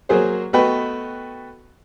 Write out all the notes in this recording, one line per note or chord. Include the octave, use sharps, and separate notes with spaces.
F#3 A#3 F#4 G#4 C5
A3 B3 F#4 B4 D#5 G5